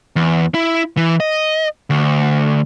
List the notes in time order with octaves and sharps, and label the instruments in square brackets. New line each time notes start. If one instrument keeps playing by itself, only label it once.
[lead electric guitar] E2
E4
E3
D#5
D2